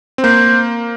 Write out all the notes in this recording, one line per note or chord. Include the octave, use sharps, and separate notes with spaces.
C4
A#3 C5